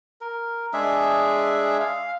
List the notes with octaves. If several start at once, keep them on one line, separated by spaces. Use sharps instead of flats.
A#4
G#3 D4 G#4 E5
F5